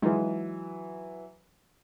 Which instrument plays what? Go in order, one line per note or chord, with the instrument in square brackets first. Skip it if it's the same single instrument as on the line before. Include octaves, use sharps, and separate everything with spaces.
[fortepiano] E3 F#3 [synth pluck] G#3 D#4 F4